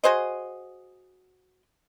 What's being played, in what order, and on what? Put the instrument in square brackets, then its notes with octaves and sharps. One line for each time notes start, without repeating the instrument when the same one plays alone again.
[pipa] F#4 G#4 C5 D#5